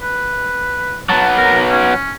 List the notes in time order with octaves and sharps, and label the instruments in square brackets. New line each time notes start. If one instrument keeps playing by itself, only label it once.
[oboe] B4
[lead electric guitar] F#3 B3 [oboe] A5
[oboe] A#4
C#4